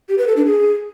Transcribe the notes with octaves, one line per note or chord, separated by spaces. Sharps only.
G4
B4
A4
D4
G#4